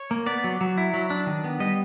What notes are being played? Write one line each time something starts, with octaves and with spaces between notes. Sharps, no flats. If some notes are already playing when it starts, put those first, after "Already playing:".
Already playing: C#5
A#3
B3 D5
F#3
F#3
E4
F#3
D4
D#3
B3
G3 D#5